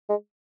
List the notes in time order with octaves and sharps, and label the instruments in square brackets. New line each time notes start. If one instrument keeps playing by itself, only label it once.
[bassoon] G#3